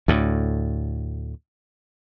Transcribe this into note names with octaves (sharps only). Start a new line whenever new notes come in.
D2 A2